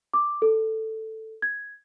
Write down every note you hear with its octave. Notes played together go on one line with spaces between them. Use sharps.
D6
A4
G#6